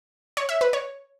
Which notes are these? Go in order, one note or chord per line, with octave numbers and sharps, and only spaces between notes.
C#5
E5
B4
C#5